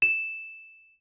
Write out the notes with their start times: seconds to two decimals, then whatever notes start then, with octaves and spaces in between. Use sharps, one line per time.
0.02 E7